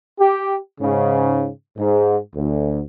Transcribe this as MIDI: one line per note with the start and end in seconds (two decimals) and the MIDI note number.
0.19 0.57 67
0.81 1.47 44
0.81 1.47 49
1.77 2.17 44
2.35 2.80 38